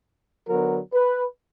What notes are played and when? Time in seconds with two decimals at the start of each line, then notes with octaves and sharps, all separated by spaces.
0.48 D3 F#3 B3 A#4
0.92 B4